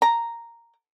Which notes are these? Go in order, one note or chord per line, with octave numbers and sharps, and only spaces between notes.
A#5